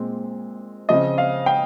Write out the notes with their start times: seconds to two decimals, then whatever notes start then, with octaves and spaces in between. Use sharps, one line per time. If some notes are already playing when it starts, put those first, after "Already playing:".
Already playing: A#2 G#3 C4
0.89 C#3 F3 C4 D#5
1.18 F5
1.46 G5